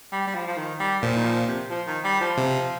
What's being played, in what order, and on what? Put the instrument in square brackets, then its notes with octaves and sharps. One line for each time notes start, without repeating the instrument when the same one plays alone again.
[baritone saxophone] G3
G3
F3
F3
D#3
G3
[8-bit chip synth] A#2 [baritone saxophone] F3
[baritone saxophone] D#3
F3
C3
F3
D#3
G3
F3
[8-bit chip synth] C3